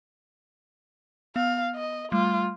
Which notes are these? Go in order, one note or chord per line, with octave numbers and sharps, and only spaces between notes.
B3 F5
D#5
G3 A3 F4